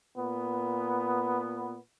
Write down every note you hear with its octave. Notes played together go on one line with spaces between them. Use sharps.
A#2 B3